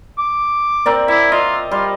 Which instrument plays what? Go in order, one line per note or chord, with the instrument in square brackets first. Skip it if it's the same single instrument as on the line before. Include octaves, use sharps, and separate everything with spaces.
[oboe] D6
[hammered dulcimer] C4 A#4 D5
[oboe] E4 [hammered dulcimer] E5
[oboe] F4 [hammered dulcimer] D#5
[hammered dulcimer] G3 [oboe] F4